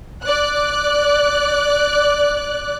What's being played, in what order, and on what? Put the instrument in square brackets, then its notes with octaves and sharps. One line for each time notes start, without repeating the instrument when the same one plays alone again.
[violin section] D5 F#6